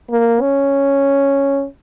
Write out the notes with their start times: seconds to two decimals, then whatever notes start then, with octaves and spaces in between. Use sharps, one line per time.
0.11 A#3
0.41 C#4